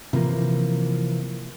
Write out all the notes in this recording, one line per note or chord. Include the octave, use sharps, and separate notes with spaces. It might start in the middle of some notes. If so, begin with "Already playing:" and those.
C3 E3 F3 A#3